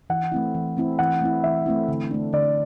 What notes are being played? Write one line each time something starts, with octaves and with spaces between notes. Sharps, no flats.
E3 F#5
A3 C4 E4
E3
A3 C4 E4
E3 F#5
A3 C4 E4
E3 E5
A3 C4 E4
D3
A3 D4
D3 D5